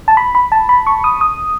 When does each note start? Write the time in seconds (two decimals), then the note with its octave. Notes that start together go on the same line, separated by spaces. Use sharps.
0.08 A5
0.17 B5
0.35 B5
0.52 A5
0.69 B5
0.87 C#6
1.04 D#6
1.21 D#6